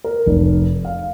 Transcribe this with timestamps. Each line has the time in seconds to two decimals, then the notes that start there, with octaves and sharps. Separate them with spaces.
0.04 A#4
0.26 F1
0.85 F5